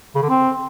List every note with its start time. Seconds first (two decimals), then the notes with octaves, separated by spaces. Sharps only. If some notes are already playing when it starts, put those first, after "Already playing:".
0.16 C#3
0.23 D3
0.30 C4